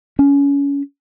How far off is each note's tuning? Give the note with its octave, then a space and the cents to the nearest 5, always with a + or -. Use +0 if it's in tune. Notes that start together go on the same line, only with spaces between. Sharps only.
C#4 +25